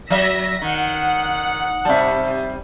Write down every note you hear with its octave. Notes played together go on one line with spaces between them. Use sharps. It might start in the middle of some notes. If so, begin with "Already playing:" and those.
F#3 E5 E6 A#6 B6
D#3 F#5
C3 G3 E5 A5